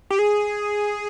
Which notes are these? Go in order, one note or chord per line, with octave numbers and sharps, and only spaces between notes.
G4
G#4